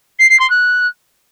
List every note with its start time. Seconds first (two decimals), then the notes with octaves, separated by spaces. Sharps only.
0.19 C7
0.29 C7
0.39 C6
0.49 F#6